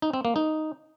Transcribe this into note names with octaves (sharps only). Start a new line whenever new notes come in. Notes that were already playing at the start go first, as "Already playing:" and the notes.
D#4
C4
A#3
D#4